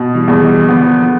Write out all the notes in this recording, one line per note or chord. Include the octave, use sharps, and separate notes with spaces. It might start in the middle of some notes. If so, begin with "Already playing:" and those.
Already playing: B2
E3 G3
E2
E3 G3
D3 F3 B3